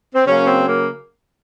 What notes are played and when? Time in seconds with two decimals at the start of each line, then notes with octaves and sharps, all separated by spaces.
0.15 C4
0.26 C#3 F#3 A#3 C#4
0.47 C4
0.68 A#3